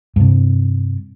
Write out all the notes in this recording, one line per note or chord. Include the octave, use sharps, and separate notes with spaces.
G2 C3